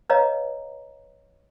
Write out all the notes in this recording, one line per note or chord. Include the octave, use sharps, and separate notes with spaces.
B4 C#5 D#5 F5 A#5